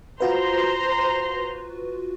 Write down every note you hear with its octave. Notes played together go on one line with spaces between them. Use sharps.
F4 F#4 B4 C5 A#5 C6